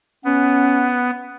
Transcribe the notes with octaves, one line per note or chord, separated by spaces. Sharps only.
B3 C#4